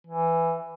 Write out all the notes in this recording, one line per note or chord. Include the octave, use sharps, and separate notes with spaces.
E3